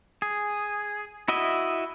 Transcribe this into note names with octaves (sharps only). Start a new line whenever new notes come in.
G#4
E4 F#4 D#5 E5